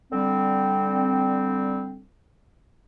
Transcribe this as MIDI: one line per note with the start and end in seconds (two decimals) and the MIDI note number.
0.11 2.04 50
0.11 2.04 55
0.11 2.04 60